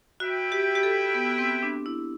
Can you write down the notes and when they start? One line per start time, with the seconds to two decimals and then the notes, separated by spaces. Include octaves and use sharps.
0.20 E4 F#4 B4 E5 G5
0.52 G4
0.75 G4
0.83 A4
1.15 B3
1.38 C4
1.63 D4
1.86 E4